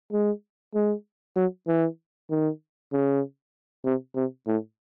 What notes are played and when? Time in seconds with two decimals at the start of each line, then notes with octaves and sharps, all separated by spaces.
0.12 G#3
0.74 G#3
1.36 F#3
1.67 E3
2.30 D#3
2.92 C#3
3.84 C3
4.15 C3
4.47 A2